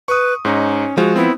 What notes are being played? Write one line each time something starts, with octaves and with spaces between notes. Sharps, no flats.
B4 C#6 D#6
G#2 C#4 D#4
F3 G#3 F#4
B3 C4 E4